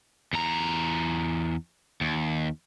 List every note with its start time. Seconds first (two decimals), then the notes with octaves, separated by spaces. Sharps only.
0.33 E2 A#5
2.01 D#2